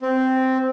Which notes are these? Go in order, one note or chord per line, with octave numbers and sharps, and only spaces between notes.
C4